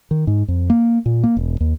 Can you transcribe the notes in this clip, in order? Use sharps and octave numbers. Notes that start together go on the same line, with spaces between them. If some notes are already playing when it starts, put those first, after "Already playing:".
D#3
G#2
F2
A#3
A#2
A#3
E1
D#2